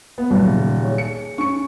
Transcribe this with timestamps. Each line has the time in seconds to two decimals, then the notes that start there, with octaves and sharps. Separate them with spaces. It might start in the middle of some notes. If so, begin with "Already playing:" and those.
0.18 B3
0.30 D#1 F#2 F#3
0.44 C#3
0.79 G#4 C#5
0.98 C#7
1.38 C#4 C#6 C#7